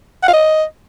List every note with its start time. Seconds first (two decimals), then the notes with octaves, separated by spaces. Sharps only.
0.23 F#5
0.28 F5
0.33 D#5